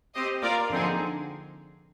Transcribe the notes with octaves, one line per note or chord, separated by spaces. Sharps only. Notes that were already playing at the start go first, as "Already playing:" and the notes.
C4 G4 C5 D#5
A#3 F4 A#4 D5
D3 F3 C4 D#4 G#4